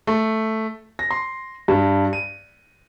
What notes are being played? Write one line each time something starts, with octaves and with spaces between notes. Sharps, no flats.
A3
A#6
C6
G2
D#7